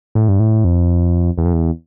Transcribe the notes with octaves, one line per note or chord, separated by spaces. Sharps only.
A2
G2
A2
F2
E2
F2
E2